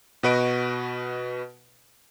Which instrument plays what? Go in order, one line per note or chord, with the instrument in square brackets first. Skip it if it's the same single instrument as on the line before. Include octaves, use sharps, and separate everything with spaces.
[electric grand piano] B2 F#4 B4 D#5 D7